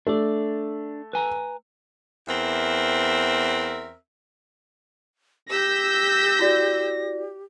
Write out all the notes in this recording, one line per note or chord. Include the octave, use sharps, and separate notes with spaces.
A3 D4 D5
B4 G#5 A#5
E2 C4 A#4 E5
G4 E6 G6 A#6 B6
E4 F#4 D5